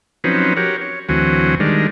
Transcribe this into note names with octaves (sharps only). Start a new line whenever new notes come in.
F3 F#3 C4 C#4 D#4 B4
F#4 G4 A#4 C#5
C#5
D2 E3 F#3 C4 F#4 G#5
D#3 G3 G#3 D4 A#4